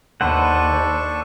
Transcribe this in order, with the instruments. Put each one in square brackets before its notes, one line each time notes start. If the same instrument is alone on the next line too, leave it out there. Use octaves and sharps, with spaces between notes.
[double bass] D#2 [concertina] D4 A4 C#6 [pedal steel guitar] B4 C5 F#5